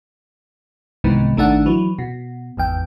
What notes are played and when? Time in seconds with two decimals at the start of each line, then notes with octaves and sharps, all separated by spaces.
1.04 C2 G#2 C3 D#3 E3 B3
1.36 A1 D#3 A3 D4 F#5
1.66 E3 F#3
1.98 B2
2.57 G#1 E2 G5